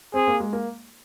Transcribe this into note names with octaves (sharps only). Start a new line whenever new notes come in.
C4 G#4
A#3
G#3
A#3